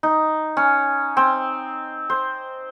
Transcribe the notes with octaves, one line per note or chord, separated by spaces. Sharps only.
D#4
C#4
C4
C5